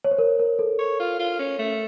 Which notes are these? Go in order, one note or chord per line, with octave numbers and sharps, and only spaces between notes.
C#5
C5
A#4
A#4
A4
C#5
F4
F4
C#4
A3